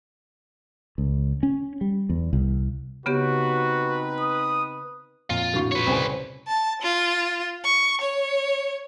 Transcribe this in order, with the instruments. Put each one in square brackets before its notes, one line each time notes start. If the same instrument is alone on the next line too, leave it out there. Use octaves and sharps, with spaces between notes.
[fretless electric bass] C#2
C#4
G3
E2
C2
[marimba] C#3 B3 G4 [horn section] C4 D#4 B4 [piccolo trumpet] F#4
[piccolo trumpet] D#6
[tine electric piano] F2 A#2 [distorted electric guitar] F4
[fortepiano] A2 D3 C#6 [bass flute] F#4
[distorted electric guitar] B4 C#5
[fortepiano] C2 C#3 G#5 [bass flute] C5
[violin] A5
F4
C#6
C#5